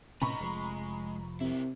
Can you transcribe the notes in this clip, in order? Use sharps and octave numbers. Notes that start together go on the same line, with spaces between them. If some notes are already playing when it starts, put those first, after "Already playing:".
A2 C3 C#4 D#4 B4 A#5 B5 C#6
F1 F3 G#3
C3 E4 A#4